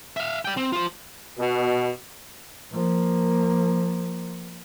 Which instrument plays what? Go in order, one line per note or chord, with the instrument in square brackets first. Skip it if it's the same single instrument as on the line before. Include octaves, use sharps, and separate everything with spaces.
[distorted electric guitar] E5 F5
D5 G5
C4
F4 C5
[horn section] B2
[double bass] F3 A#3